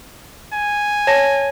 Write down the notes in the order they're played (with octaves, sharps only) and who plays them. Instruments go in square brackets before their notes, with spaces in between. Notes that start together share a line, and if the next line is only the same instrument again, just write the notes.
[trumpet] G#5
[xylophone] C#5 A5 A#6